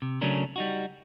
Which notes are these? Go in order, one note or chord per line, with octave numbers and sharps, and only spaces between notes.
C3
C#3 F#3 A3 C#4 D4 A#4
G3 D#4 F#4